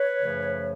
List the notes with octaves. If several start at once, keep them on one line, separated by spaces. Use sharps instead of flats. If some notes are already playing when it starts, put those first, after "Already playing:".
Already playing: B4 C#5
F#2 C#3 F3 A3